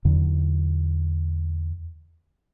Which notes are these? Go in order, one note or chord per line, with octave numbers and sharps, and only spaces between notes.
E2 D3 F#3